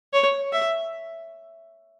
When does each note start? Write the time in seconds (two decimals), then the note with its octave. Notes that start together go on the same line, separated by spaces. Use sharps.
0.13 C#5
0.52 E5